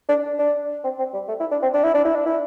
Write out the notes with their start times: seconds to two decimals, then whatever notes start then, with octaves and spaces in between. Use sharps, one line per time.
0.09 D4
0.39 D4
0.84 C4
0.99 C4
1.14 G3
1.28 A3
1.40 E4
1.52 D4
1.63 C4
1.74 D4
1.84 E4
1.94 D4
2.05 E4
2.16 D4
2.26 E4